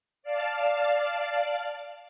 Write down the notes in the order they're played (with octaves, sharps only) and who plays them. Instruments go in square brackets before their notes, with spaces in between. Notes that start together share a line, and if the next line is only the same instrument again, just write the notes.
[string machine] D5 F5 A5